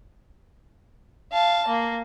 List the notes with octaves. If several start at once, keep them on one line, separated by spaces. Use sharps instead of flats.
F5 A5
A#3